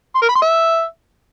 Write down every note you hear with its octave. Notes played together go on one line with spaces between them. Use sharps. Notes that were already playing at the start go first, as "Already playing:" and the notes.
C6
A#4
B5
C6
E5